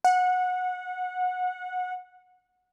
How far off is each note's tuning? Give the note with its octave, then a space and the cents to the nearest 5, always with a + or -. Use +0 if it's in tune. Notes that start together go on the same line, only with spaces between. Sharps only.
F#5 -20